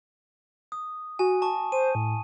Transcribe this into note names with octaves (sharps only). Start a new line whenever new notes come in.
D#6
F#4 G#5
A5 C#6
C5 D#7
A2